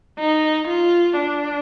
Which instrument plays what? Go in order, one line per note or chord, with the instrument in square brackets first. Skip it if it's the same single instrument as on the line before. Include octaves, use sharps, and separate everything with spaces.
[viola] D#4
F4
D4